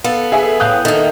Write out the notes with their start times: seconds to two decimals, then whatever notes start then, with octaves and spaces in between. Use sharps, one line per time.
0.04 B3 A4 F5
0.32 G#4 E5 G#5
0.60 A2 F5 G5 D#6 F#6 G6
0.85 D#3 A#3 A4 E5